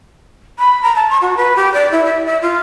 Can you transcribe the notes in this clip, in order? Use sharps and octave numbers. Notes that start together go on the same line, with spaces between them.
B5
A#5
A5
C#6
F#4
B4
G4
D5
E4
E5
E5
F4